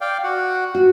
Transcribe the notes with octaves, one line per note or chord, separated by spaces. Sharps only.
D5 F5 G5
F#4 F#5
F#4